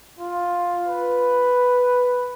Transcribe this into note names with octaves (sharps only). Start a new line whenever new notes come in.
F4
B4